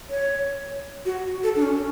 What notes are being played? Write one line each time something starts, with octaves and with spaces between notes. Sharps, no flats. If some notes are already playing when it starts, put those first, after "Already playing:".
C#5
F#4
A4
D4
C#4